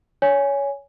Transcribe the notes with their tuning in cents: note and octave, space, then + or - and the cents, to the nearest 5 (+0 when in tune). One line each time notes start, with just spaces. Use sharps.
C#5 +20 G#5 -5